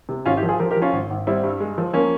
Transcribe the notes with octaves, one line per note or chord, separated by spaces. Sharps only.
C3
G#1 C#4 F4
E4 G4
F3
F4 G#4
F3 G4 A#4
G4 A#4
F3
C#4 F4
G#1
G#1
G3 C4 E4
G2
G#3
F3
F3 A#3 C#4